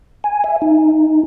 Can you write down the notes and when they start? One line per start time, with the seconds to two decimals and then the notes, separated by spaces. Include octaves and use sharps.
0.24 G#5
0.44 E5
0.62 D#4